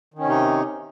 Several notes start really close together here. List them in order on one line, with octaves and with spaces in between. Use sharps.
D#3 C#4 C3 D#4